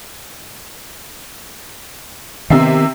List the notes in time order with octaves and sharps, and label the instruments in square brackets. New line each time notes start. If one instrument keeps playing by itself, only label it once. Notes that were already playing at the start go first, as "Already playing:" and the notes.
[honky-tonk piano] C3 E5 C7 [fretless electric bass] D#3 B3 C4